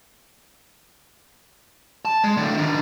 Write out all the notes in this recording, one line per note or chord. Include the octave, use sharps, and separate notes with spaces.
A5
G#3
A2 D3
D#3 D4